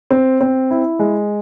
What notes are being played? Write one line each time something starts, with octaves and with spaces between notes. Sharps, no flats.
C4
C4
E4
G#3